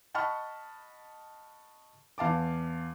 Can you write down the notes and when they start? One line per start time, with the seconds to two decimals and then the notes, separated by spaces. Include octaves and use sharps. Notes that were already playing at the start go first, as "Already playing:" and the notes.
0.14 D#5 F#5 A5 B5 C#6 F6
2.18 E2 F5 A5 D6